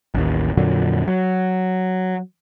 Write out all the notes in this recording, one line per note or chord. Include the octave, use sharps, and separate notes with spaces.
A1 D#2
F2 A#2 D3 F#3
F#3